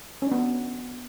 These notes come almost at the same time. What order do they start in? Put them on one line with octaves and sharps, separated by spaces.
C#4 D4 B3